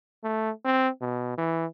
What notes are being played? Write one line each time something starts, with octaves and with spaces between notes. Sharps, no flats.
A3
C4
B2
E3